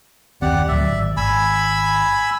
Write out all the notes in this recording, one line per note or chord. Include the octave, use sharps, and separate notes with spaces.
F#1 D#2 C4 G4 D5 F#5
D2 A2 F#3 D5 E5
G#1
G#1 G#5 B5 E6